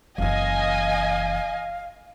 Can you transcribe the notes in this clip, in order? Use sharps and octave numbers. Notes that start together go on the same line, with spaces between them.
F#1 E3 D#5 F5 G#5